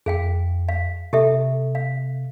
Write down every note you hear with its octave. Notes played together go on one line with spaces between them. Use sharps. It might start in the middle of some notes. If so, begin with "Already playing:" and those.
F2 G#4 F5 G5
F5
C3 G4 A4 E5
F5